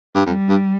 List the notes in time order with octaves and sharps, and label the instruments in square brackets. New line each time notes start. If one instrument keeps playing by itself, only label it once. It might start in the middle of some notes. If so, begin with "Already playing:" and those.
[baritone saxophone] G2
[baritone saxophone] F2 [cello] G3
[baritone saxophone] G2